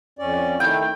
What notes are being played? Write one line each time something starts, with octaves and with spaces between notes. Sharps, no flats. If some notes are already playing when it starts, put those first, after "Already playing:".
F2 C#4 D5
D#3 A3 E4 G5